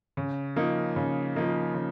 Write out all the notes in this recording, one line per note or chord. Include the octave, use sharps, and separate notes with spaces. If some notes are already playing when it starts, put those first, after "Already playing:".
C#3
F3 A#3 D#4
C#3
F3 A#3 D#4
C#3